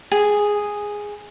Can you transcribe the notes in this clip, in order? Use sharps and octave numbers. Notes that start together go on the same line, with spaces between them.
G#4